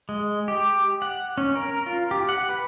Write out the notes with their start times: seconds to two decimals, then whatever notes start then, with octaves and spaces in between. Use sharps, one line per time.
0.09 G#3
0.48 G4
1.02 F#5
1.38 C#4
1.55 A#4
1.86 F4
2.11 G4
2.29 F#5
2.49 B4